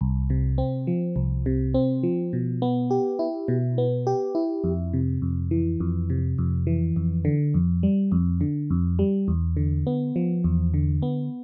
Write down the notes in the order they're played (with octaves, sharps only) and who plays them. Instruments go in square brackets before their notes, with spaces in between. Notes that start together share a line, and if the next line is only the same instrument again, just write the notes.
[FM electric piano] C2
C3
C4
F3
C2
C3
C4
F3
B2
B3
G4
E4
B2
B3
G4
E4
F2
C3
F2
E3
F2
C3
F2
E3
F2
D3
F2
G3
F2
D3
F2
G3
E2
D3
B3
F3
E2
D3
B3